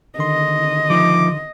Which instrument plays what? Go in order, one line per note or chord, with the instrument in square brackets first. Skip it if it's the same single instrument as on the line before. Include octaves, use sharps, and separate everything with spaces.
[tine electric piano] D3 D#3 C6 [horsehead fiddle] D#5
[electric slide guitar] F3 D#4 [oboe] D6